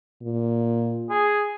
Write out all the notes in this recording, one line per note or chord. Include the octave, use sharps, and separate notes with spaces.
A#2
G#4